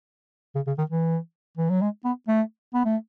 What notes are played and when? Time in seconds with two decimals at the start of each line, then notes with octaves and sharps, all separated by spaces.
0.55 C#3
0.67 C#3
0.78 D#3
0.90 E3
1.57 E3
1.70 F#3
1.82 G#3
2.05 B3
2.28 A3
2.74 B3
2.85 A3